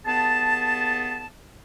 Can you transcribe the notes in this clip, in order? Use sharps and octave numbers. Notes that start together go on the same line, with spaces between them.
D#2 B3 G#4 A5